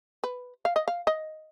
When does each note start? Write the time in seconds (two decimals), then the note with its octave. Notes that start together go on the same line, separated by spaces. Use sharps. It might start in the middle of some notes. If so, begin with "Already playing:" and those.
0.24 B4
0.65 F5
0.76 D#5
0.88 F5
1.07 D#5